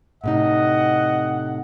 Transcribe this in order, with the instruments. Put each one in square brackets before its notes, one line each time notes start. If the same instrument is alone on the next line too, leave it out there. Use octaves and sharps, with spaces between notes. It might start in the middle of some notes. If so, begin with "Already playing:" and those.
[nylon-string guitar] A2 C3 D#4 [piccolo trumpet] D#5 [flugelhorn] F#5